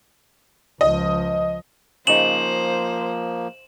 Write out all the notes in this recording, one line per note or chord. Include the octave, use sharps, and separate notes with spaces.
C#2 F3 D#5
C#3 F3 A#3 D#4 C5 E7 F#7